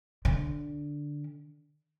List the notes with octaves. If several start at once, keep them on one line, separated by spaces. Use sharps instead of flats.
D3